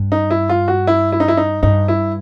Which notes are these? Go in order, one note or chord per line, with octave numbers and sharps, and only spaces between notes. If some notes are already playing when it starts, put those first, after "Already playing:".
Already playing: G2
D#4
E4
F4
F#4
E4
E4
D#4
E4
D#4
G2 D#4
E4